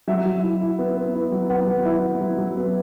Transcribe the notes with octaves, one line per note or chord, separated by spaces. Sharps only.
F#3 E5
F#3
E4
E4
B3
B3
E4
F#3
B3 F#5
F#3
E4
B3
F#3
F#3
B3